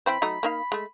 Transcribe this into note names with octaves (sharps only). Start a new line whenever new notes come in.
E3 C4 C5 B5
F#3 A3 D#4
A#3 D#4 F5
G#3 A3